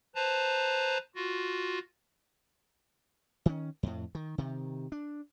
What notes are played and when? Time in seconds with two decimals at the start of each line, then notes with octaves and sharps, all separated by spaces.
0.15 B4 C5 A5 A#5
1.15 F4 F#4
3.46 D#3 C#4
3.83 F2 A2
4.15 D#3
4.38 C3 D#3
4.92 D4